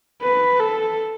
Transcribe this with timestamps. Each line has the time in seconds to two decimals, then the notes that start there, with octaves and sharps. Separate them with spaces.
0.22 B4
0.59 A4